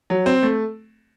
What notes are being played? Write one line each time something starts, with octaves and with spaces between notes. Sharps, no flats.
F#3
C4
A3